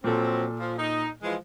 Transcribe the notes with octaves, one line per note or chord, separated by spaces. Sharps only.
A#2 F3 F#3 C4 A4
F3
D#4
E3 F3 G#3